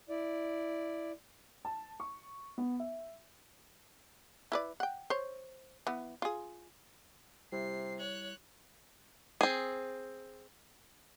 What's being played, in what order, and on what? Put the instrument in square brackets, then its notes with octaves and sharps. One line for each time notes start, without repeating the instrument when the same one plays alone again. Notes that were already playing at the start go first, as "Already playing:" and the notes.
[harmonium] E4 D5
[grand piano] A5
C#6
B3
E5
[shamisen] E4 B4 D5
F#5 G5
C5 C#5
E3 B3
F4 G#4
[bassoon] C3 [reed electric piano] G3 E4 [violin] C7
[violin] C#5 F#6
[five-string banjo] C4 G#4